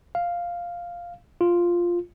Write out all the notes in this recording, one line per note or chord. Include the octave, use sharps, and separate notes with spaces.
F5
F4